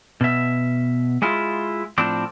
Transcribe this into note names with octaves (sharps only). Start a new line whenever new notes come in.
B2 E5
G#3 E4 F4
A2 F3 C4 D4